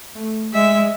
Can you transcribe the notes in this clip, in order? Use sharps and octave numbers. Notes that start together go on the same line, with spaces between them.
A3
G#3 E5